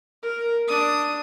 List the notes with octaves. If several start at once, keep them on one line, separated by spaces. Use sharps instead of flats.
A#4
D4 D#6